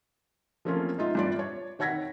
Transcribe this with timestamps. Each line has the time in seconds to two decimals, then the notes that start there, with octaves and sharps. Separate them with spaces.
0.65 F3 A3 A#3 C4 C#4 F4
0.98 G#3 D#4 F4 E5
1.15 G2 F4 D5
1.39 C#5
1.79 D#3 C#5 F#5 G#6 A#6 B6